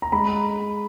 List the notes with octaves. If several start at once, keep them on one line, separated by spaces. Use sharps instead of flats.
A#5
G#3 B5